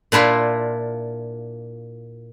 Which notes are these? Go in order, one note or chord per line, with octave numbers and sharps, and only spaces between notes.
A#2 D4 E4 F4